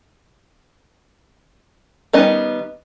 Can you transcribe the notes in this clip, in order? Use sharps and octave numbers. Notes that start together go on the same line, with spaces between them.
D#3 G3 B3 C#4 D#5